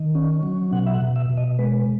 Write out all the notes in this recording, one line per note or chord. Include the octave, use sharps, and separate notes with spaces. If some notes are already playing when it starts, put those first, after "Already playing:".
Already playing: D#3
C#4
F#3
B2 F#5
E5
F#5
B2
E5
B2
D#5
G#3 B4